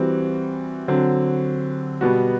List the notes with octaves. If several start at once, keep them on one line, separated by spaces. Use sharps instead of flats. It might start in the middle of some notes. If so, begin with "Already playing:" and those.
Already playing: E3 G3 C4 F#4
D3 F#3 C4
B2 G3 B3 F#4